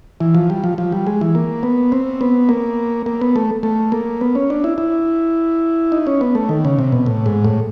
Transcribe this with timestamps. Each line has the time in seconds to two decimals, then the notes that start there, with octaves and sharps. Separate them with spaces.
0.20 E3
0.35 F3
0.50 G3
0.64 F3
0.78 F3
0.92 G3
1.07 G#3
1.21 E3
1.35 A#3
1.63 B3
1.92 C4
2.21 B3
2.49 A#3
3.06 A#3
3.21 B3
3.36 A3
3.63 A3
3.92 A#3
4.21 B3
4.35 C#4
4.50 D4
4.64 E4
4.78 E4
5.92 D#4
6.07 C#4
6.21 B3
6.35 A3
6.49 D#3
6.65 C#3
6.79 C3
6.92 B2
7.06 A2
7.26 G#2
7.45 A2